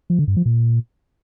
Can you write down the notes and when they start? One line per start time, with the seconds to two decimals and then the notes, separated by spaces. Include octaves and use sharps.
0.10 F3
0.19 D3
0.28 G2
0.37 F3
0.46 A#2